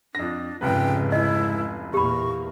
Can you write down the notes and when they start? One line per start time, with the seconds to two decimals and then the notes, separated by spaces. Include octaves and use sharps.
0.15 F2 D4 A#6
0.61 F1 C#2 G#2 C#3 B4 G5
1.12 E4 D#5
1.94 E2 A#2 A#3 G4 B5 C#6